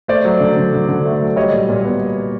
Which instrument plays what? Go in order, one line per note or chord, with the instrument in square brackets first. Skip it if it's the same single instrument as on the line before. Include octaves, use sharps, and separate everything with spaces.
[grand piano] A3 C5 D5
F#3
D3
D3
D3
D3
A3
F#3
G3 C#5 D#5
A#2
A#2
B3